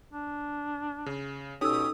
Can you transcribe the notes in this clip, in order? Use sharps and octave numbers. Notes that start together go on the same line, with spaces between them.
D4
C#3
B2 C#4 D#4 G4 A4 D#6 E6